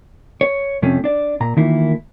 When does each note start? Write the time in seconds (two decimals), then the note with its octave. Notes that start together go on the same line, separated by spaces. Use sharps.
0.41 C#5
0.82 F2 C3 F3 A3 C#4
1.04 D4 D5
1.40 A#2 A#5
1.57 D#3 E3 A3 A#3 E4 F4